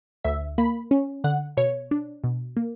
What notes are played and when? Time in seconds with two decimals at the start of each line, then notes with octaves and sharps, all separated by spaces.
0.24 D2 E5
0.58 A#3 B5
0.91 C#4
1.24 D3 F#5
1.57 B2 C#5
1.91 D4
2.24 B2
2.57 A#3